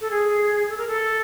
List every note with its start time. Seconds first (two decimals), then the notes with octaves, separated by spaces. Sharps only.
0.01 A4
0.11 G#4
0.69 A4
0.78 A#4
0.88 A4